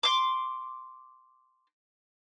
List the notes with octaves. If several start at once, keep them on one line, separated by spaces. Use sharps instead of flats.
C6 D6